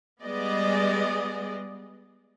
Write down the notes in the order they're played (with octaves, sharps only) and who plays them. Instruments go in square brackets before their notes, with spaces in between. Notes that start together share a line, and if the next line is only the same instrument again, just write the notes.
[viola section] G3 G#3 B3 G#4 D5 D#5